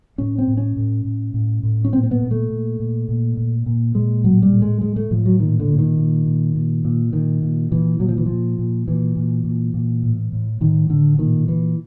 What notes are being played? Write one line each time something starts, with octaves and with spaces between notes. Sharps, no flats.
A2 C#4
C4
A2
C#4
A2
A2
A2
A2
C#4
A#2 C4
C4
B3
A#2
A3
A#2
A#2
A#2
A#2
A#2
A#2 G#3
A2 F#3
G3
A2
G#3
A2 G#3
A3
A2 F3
F#3
A#2 D#3
D3
A#2
D#3
A#2
A#2
A#2
A#2
A#2 D#3
A#2
A#2 E3
A#2 F#3
F3
E3
A#2 F3
A#2
A#2 E3
A#2
A#2
A#2
A2
A2
A2 D#3
A2 D3
A#2 D#3
A#2 E3